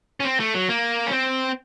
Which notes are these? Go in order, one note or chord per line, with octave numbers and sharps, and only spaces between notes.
C#4
C4
A3
F#3
A#3
C#4
C4